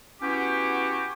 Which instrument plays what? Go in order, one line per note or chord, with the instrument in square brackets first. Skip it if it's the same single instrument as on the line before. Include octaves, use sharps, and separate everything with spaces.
[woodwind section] B3 C#4 E4 F#4 G4